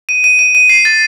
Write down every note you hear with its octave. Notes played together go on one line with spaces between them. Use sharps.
D#7
D#7
D#7
D#7
C7
A6